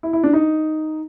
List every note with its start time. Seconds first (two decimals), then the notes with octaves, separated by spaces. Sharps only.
0.03 E4
0.13 E4
0.23 D4
0.33 D#4